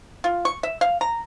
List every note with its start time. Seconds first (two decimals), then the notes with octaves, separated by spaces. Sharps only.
0.24 F4
0.45 C#6
0.63 E5
0.81 F5
1.01 A#5